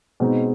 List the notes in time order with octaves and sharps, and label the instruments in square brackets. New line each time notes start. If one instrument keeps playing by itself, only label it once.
[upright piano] B2 G#3 C4 D#4